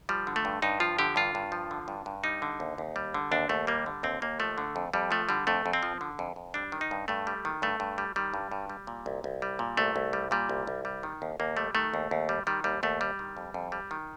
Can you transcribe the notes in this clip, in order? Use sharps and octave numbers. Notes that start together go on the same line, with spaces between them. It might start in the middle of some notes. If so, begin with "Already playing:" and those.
F3 G3
D3
A3
G2
G2 D#4
F3 F4
D3 G4
G2 F4
G2
F3
D3
G2
G2
G3 D#4
D3
D#2
D#2
G3
D3
D#2 D4
D#2 A3
G3 A#3
D3
D#2 C4
D#2 A#3
F3 A3
D3
F2
F2 G3
F3 A3
D3 G3
F2 A3
F2
C4
F3
D3
F2
F2
G3 D4
D#3
D#4
G2
G2 A3
G3
D#3
G2 A3
G2
G3
D#3 G3
G2
G2
G3
A#2
C2
C2
G3
A#2
C2 A3
C2
G3
A#2 G3
C2
C2
G3
D#3
D#2
D#2 A#3
G3 A3
D#3 A3
D#2
D#2
G3
D#3 G3
D#2 G3
D#2 A3
G3
D#3
F2
F2
G3
D#3